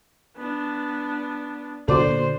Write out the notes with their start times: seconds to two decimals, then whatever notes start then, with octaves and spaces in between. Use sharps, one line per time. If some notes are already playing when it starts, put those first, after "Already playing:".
0.37 B3 D4
1.88 A#2 D3 B3 D4 F#4 A4 C5 D5